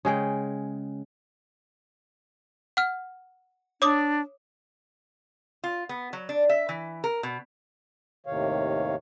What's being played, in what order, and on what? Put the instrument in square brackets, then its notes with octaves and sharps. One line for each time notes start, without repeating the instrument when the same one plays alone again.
[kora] C#3 G#3 G5
[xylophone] F#5 F6
[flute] D4 [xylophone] C#5 D6 D#6
[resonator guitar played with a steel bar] F4
B3
F#3
D4
E5
E3
A#4
B2
[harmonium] D#2 A2 C3 D#3 C#5 F5